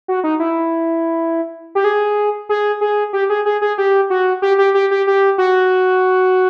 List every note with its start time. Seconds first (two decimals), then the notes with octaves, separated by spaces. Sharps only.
0.08 F#4
0.24 D#4
0.40 E4
1.75 G4
1.84 G#4
2.49 G#4
2.81 G#4
3.13 G4
3.30 G#4
3.46 G#4
3.62 G#4
3.78 G4
4.10 F#4
4.42 G4
4.58 G4
4.74 G4
4.91 G4
5.07 G4
5.38 F#4